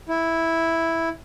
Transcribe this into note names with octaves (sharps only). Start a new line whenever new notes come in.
E4